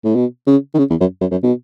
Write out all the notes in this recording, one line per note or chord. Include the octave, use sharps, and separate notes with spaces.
A2
B2
C#3
D#3
C#3
E2
F#2
F#2
F#2
B2